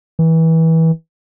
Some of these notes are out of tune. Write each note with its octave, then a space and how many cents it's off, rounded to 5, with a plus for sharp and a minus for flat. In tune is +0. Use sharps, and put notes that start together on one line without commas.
E3 -25